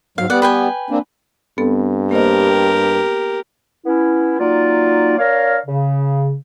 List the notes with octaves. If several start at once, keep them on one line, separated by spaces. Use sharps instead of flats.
G#2 F#3 F5
G3 B3 D5 F#5
B4 G5 G#5
A#3 C4 D4
G2 B3 C4 A4
A#3 G4 A#4 C5 D#5
B3 C#4 E4
F#3 A#3 D#4 F4 D5
D4 A#4 C#5 F5
C#3